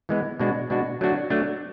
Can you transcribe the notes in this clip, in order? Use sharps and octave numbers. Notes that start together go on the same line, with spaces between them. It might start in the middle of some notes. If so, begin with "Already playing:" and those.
E3 G#3 B3
B2 G#3 D4 F#4
B2 G#3 D4 F#4
F#3 A3 D4 F#4
F#3 A3 D4 F#4